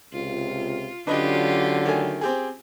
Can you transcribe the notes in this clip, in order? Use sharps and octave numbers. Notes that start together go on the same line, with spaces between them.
C#2 C3 F4
D3 F#3 C#4 D4 F4 G4 B4 D#5
D#3 A3 G#5
C4 G4 G#4